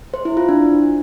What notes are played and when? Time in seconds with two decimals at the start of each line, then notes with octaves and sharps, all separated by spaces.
0.14 C5
0.25 E4
0.37 F4
0.49 D4